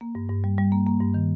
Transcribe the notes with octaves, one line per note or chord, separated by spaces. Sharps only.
A#3
G2
G2
G3
G3
A#3
A#3
G2
D#3